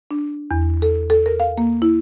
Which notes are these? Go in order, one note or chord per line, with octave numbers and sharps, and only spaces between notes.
D4
E2
A4
A4
A#4
F5
A#3
E4